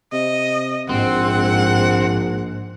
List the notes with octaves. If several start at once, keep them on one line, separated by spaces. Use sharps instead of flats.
C3 D#5
A#1 G#2 C4 F#5